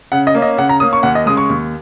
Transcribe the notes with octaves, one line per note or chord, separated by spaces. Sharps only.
C#3 F#5
D#5
A#3 C#4
D#5
C#3 F#5
A#5
A#3 C#4 D#6
C#6
D#2 F#5
D#5
C#3 G#3 D#6
C#6
D#2